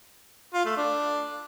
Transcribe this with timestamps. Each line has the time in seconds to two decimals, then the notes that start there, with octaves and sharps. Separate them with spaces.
0.54 F4
0.66 A3
0.77 D4